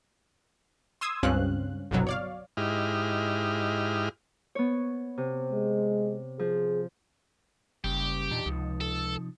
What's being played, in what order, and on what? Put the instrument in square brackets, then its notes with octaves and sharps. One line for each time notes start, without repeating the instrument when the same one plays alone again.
[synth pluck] C6 D#6 E6 G#6
C#2 G2 C4 C#4 F5 F#6
G1 C2 B2 F#3
C#5 D5 F5
[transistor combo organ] G#2 E4 G4 D#5 F6
[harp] B3 C#5
C3
[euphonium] G#3
[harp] F3 [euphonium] G#4
[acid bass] F#1 [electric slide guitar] C#3 G3 [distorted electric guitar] G4
[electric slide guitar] E2 D4 D#4 [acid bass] A#2
[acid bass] C#2 [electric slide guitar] C3 F3 D#4
[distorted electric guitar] A4